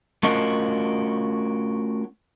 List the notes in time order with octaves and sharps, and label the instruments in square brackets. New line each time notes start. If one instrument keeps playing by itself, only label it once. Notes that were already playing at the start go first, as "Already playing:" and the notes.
[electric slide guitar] A3 C#4 F4 F#4 A#4 D#5